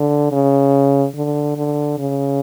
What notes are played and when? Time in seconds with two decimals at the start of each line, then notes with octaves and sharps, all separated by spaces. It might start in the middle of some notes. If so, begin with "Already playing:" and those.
Already playing: D3
0.32 C#3
1.15 D3
1.56 D3
1.98 C#3